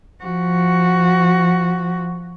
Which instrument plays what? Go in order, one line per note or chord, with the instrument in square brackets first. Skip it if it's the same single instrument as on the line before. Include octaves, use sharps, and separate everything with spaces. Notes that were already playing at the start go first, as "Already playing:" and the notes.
[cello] F3 F#4